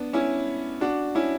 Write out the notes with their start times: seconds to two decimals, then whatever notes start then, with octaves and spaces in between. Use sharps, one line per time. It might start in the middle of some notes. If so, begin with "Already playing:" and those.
Already playing: B3 D4
0.13 C#4 E4
0.81 D4 F#4
1.15 C#4 E4